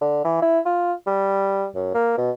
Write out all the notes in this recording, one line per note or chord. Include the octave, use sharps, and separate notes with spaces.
D3
E3
E4
F4
G3
F#2
A#3
B2